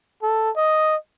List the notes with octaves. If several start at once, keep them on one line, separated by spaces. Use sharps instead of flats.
A4
D#5